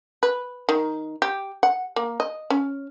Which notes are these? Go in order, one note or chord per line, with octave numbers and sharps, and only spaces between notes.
B4
D#3
G4
F#5
A#3
D#5
C#4